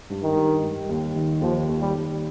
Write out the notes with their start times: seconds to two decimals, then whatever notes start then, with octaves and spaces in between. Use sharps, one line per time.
0.10 G2
0.23 D#3
0.36 G2
0.63 G3
0.89 D#2
1.16 D#3
1.42 D#2 F3
1.69 D#2
1.81 G3
1.95 D#2